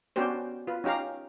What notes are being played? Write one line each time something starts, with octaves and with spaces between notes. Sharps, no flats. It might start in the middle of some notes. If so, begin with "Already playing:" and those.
B3 C#4 D4 F#4 G4 C5
F4 B4
C#4 D#4 G4 F5 A#5